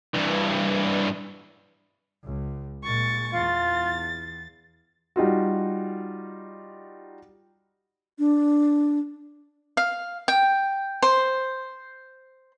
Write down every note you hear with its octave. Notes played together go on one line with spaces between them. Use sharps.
G2 E3
C#2
A#2 G#3 C#6 A6
E2 F4 A6
G3 D#4 F4 F#4
D4
F5
G5
C5